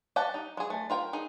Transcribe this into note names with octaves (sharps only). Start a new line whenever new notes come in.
G4 F#5 G5 A5
D#4
G#3 G#4
A3
F4 A#4 G5
D#4 G#4